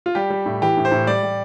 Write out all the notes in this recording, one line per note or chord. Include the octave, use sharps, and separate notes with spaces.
F4
G3 G4
G3
A2
E3 G4
A2
C5
A2
G3 D5
G3